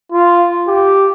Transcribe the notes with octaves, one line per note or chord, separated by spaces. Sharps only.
F4
G4